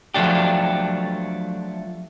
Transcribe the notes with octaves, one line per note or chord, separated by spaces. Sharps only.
F3 F#3 A3 D4 G4